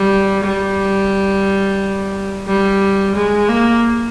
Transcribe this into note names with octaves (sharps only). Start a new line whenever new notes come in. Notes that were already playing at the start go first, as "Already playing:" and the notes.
Already playing: G3
G3
G3
G#3
A#3